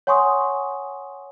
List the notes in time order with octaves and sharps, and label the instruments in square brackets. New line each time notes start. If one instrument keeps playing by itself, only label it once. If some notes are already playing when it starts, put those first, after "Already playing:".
[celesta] C#5 F#5 G#5 C6 C#6 D#6